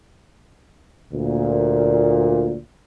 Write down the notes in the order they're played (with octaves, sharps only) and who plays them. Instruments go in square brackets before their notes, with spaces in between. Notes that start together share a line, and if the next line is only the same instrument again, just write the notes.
[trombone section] D2 A#2